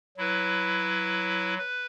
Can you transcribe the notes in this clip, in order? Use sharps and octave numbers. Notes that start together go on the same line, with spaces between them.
F#3 E4 B4
B4